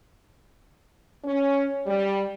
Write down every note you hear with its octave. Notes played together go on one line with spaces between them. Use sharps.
C#4
G3